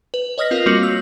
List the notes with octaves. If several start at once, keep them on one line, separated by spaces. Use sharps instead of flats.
B4
C#5 D#5 D#6 F6 A#6 B6
C4 F4 A#4 F5
G3 A#3 C4 F#4
E6